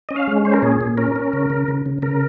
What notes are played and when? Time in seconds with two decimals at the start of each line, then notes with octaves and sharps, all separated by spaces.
0.09 C#4 D#5
0.16 F5
0.27 G#3
0.45 C#4 C5
0.54 A#4
0.62 A#2 G#4
0.81 A#2
0.97 C#4 A#4
1.16 C#4
1.33 C#3
1.50 C#3
1.68 C#3
1.86 C#3
2.02 C#3 A#4